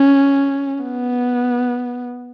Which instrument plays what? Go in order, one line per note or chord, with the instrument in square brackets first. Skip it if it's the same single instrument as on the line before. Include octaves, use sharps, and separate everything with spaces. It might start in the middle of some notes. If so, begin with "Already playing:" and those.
Already playing: [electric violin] C#4
B3